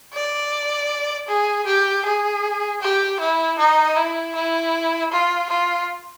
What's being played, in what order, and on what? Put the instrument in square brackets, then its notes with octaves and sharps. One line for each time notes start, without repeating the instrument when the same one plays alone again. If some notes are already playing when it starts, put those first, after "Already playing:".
[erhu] D5
G#4
G4
G#4
G4
E4
D#4
E4
E4
F4
F4